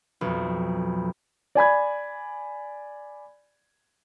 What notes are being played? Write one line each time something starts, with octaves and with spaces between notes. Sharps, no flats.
B1 F2
D5 G#5 B5 G#6